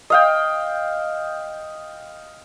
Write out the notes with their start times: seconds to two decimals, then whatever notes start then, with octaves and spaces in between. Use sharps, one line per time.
0.10 D#5 F5 G5